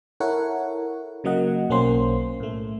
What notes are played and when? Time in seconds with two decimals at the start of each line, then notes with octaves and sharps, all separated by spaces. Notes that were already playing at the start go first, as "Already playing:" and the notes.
0.20 E4 A4 A#4 C#5 F#5
1.24 C#3 F#3 A#3 D#5 F#5
1.70 B1 A#3 C#4 C5 C6
2.40 A2 A3